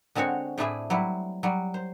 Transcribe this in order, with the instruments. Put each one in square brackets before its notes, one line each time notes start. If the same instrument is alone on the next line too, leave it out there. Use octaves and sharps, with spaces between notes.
[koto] D3 G#3 C4 F#4 C#5
A2 A3 D4 E4 G#4 E5
F#3 G3 E4
F#3 G3
C5